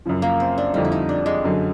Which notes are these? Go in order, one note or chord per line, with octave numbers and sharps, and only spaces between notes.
F#2 C#3 F3
A#3
C4
D4
F2 D3 G3 D#4
E4
D#4
D4
G#3
F#2 D3 F#3